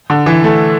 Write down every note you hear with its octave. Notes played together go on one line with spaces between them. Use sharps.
D3
E3
A3